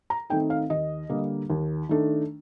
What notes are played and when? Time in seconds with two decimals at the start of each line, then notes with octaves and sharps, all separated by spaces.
0.10 A#5
0.30 D#3 A3 C4 D#4 G5
0.50 F5
0.70 D#2 D#5
1.09 D3 G3 A#3
1.50 D#2
1.89 D#3 A3 D4